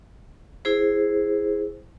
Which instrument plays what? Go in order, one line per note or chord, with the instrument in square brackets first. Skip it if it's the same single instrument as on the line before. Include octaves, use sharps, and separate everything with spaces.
[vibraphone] E4 G#4 C5